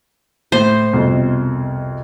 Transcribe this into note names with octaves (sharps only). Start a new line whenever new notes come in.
A2 C5
C2 F2 B2